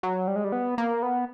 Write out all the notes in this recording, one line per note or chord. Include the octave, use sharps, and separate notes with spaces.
F#3
G3
G#3
G3
B3
A#3
B3